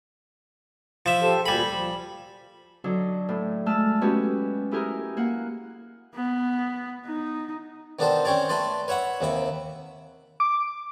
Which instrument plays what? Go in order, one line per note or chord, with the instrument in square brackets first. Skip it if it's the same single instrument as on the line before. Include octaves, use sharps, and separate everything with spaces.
[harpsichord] F3 E5
[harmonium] G4 A4 C5
[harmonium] D2 A#2 G#5 [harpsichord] G3 B5
[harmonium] F3
[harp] D3 F#3 D4 D#4
A2
G#3 A3 A5 E6 F6
G#3 B3 C#4 F#4 G4
D#4 E4 G4 G#4 A#4
A#3 F#5
[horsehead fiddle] B3
D#4
[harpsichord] D#3 B3 D4 G4 A4 C5
C4 C#4 G4 C#5 D5
A3 A4 B4 D5 C6
B4 C#5 E5 F#5 B5
D#2 C3 E5 B5
[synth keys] D6